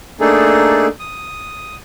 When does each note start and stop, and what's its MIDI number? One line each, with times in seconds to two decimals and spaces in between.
0.20 0.87 57
0.20 0.87 58
0.20 0.87 62
0.20 0.87 63
0.20 0.87 68
0.20 0.87 69
1.00 1.76 87